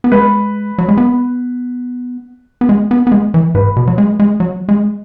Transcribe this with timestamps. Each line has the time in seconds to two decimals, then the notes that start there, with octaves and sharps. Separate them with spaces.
0.04 B3
0.12 G#3 B4
0.78 F#3
0.89 G#3
0.97 B3
2.61 B3
2.69 G#3
2.91 B3
3.07 B3
3.12 G#3
3.34 E3
3.54 G#2 B4
3.76 B2
3.87 F#3
3.98 G#3
4.19 G#3
4.40 F#3
4.69 G#3